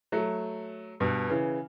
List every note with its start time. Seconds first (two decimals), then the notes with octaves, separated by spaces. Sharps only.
0.12 F#3 A3
1.00 G2 B2
1.30 C#3 E3